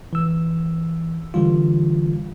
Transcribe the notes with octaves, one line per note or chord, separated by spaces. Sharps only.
E3 E6
D3 E3 G3 F4